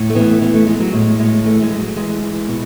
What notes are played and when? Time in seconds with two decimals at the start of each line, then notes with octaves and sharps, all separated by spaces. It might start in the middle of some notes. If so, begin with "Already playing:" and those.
Already playing: A2
0.10 A3
0.15 E3 B3
0.42 E3 B3
0.54 A3
0.67 E3 G#3
0.80 F#3
0.93 A2 G#3
1.19 A2 G#3
1.44 E3 A3
1.62 G#3
1.70 E3
1.79 F#3
1.96 E3 G#3
2.22 E3
2.48 B2